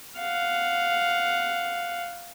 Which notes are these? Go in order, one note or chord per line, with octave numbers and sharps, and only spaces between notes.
F5 F#5